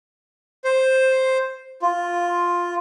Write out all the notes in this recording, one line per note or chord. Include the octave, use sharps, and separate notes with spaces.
C5
F4